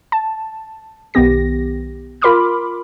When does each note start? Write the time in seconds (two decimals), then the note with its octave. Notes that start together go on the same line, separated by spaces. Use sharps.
0.12 A5
1.14 B1 D#3 B3 G4 A#6
2.22 F4 A#4 B5 C6 D6 F6